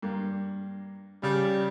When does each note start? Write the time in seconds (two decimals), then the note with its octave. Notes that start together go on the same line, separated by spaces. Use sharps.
0.02 G2 A#3
1.23 C#3 G3 F6